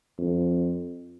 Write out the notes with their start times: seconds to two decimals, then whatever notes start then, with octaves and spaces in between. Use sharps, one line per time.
0.18 F2